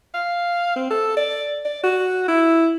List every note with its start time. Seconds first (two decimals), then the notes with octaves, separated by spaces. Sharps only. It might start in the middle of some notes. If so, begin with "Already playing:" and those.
0.14 F5
0.76 C4
0.91 A4
1.17 D5
1.65 D5
1.84 F#4
2.28 E4